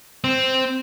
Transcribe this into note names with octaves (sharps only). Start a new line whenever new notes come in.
C4